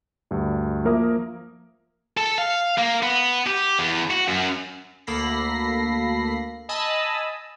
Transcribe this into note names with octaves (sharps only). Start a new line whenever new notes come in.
D2 G2
F3 A#3 A#4 E5 D#6
A4
F5
A#3
B3
G4
E2
F#4
F#2
D2 A#3 A4 B5 A#6 C7
D#5 G#5 A5 B5 D#6 E6